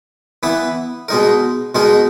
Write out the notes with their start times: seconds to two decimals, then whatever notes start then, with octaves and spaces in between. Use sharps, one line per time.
0.43 E3 B3 E4 B4
1.08 B2 G#3 D#4 A#4
1.75 B2 G#3 D#4 A#4